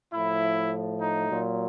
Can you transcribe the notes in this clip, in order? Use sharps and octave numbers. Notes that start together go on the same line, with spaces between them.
A2 F3 E4
D#4
A#2 F#3